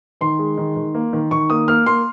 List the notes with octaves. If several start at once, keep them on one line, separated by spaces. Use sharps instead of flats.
D#3 C6
G#3
D#3
D#3
A#3
D#3
D#3 C#6
A#3 D#6
A#3 F6
A#3 C6